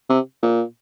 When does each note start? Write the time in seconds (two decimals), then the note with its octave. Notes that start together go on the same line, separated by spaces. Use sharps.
0.09 C3
0.43 A#2